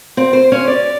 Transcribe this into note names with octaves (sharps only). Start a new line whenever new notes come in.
C4
C5
C#4
D5